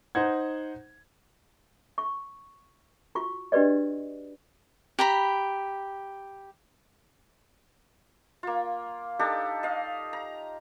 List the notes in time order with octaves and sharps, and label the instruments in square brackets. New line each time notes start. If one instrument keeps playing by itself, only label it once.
[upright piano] D#4 C5 F#5 G#6
[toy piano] C#6
F4 F#4 C#6
D4 F#4 G4 B4 D5 D#5
[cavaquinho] G4 A#5 B5
[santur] A#3 F4
D4 D#4 G4 A4
D#5 F5
A#5